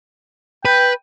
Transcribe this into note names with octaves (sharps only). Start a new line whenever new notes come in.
B4 G5